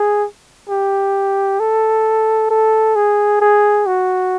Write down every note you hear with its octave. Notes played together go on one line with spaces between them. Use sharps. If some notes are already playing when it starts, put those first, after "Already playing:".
Already playing: G#4
G4
A4
A4
G#4
G#4
F#4